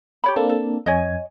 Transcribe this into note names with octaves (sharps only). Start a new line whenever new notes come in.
G4 C#5 B5
A#3 C4 D4 A4
A4
F2 C#5 D#5 G#5